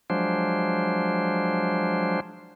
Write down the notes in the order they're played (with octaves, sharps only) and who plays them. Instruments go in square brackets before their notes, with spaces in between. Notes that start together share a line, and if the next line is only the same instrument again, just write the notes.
[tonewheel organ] F3 F#3 G#3 D4 C5